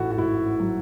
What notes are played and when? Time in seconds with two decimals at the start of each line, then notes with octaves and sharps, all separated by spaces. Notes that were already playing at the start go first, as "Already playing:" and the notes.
Already playing: A1 G#2 E4 F#4 A4
0.11 F#4
0.18 G#2 E4
0.60 F#3